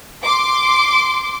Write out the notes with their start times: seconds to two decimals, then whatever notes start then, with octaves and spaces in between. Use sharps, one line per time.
0.24 C6 D6